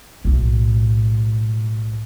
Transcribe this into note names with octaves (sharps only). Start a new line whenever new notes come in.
B1 A2